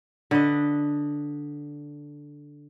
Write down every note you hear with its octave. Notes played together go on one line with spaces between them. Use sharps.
D3 B4 D#5